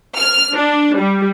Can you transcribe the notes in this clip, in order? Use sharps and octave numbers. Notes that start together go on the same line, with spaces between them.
F6
D4
G3